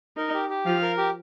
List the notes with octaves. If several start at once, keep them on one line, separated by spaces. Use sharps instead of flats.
D#4 A#4
G4
G4
F3 F5
A#4
G4